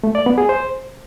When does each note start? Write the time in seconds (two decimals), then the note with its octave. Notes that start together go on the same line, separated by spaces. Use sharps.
0.04 A3
0.15 D5
0.26 B3
0.38 G#4
0.49 C5